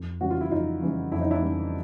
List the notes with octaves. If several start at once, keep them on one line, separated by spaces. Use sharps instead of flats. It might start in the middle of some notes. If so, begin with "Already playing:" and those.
Already playing: F2
C#3 E3 G3 F#4
F4
E4
F2 D#4 F4
C#3 E3 G3
F2 E4
D#4
D4 E4
C#3 E3 G3